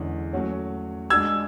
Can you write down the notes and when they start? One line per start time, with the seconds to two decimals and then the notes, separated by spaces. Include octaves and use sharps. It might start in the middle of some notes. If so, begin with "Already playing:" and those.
Already playing: E2 D3 G#3 C#4 E4
0.33 F#3 A3 C#4 F#4 C#5
1.10 G#3 D4 F#4 E6 G#6